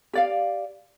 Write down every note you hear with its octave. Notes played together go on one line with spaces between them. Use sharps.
G4 D5 F5